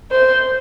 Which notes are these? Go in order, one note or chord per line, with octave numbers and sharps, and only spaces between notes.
C5